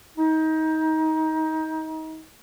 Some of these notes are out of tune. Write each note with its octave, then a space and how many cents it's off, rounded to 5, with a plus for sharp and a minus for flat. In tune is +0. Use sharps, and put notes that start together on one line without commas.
D#4 +25